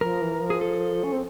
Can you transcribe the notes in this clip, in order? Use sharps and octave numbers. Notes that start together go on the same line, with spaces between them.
F3 A#4
E3
F3
G#4
A4
C#4
C4